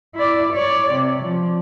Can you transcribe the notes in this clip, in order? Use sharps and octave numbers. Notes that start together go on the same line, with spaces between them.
E4 D5
C#5 D5
C3
F3